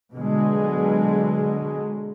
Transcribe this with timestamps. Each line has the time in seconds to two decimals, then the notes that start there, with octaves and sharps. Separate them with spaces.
0.12 B2 D3 F#3 G#3